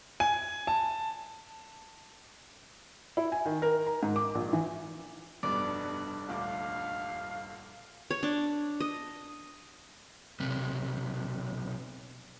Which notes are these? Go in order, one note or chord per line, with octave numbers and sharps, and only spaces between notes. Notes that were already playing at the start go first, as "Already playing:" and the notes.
G#5
A5
E4
G#5
D#3
A#4
A#5
G#2
D6
A#1
E3
F1 G2 B2 B3 D4 D5
D#1 D2 F5 D6
C#5
D4
D#5
B1 C3